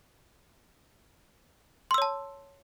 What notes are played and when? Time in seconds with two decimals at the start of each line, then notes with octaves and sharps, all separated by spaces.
1.91 C6
1.94 E6
1.98 C#5
2.02 A5